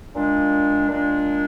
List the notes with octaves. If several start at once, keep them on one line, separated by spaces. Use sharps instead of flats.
A#2 G#3 D4
A#2 G#3 D4